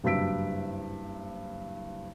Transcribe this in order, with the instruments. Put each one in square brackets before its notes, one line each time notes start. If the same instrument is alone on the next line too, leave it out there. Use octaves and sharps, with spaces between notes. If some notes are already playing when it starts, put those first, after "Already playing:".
[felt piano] F#1 G2 F#4 E6 B6 D7